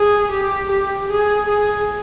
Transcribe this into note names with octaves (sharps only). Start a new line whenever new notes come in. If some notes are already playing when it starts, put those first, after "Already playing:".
Already playing: G#4
G4
G4
G#4
G#4